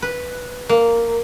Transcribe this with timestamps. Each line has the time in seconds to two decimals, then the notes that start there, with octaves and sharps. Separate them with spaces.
0.02 B4
0.69 A#3